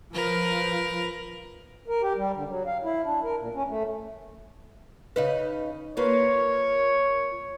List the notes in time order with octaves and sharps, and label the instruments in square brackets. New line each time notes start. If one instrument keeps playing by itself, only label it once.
[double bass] F3 [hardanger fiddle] A#4 B4
[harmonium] A#4
G4
G3
D3
F#3
F5
E4
D4
A#4
A#2
C#4
A3
[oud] C#3 D#4 B4
[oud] A#3 F4 B4 [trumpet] C#5